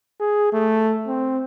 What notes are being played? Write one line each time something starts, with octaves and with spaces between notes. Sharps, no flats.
G#4
A3
C4